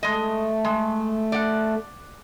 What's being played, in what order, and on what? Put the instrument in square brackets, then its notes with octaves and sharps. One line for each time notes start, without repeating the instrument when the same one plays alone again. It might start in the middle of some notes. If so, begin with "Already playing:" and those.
[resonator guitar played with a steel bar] G#3 D#5 [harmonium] A3
[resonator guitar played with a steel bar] G#3
D5 F#5